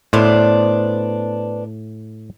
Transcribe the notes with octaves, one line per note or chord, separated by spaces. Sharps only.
A2 B3 D4 C5